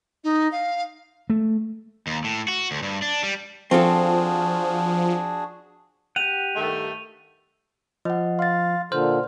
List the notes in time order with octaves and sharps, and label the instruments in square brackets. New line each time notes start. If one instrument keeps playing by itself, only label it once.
[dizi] D#4
F5
[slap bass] A3
[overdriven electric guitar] D#2
A2
F#4
D2
G2
D4
G3
[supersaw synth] F3 [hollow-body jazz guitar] C4 F4 A4 [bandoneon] D4 F#4 G#4
[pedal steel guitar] G4 F#5 [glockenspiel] D#7 F7
[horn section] G2 D#3 A3
[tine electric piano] F3 [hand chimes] D#5 F#5
[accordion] F5 [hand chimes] C6 A6
[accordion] A#2 D3 [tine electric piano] C5 [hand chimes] F6